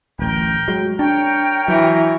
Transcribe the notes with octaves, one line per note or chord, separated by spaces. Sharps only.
D1 A1 A#4 G5
F#3 G#3
D4 A#4 C#5 G5
E3 F#3